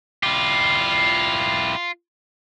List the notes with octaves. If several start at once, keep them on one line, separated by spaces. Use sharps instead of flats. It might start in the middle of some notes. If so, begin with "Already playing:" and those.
E4 F4 G4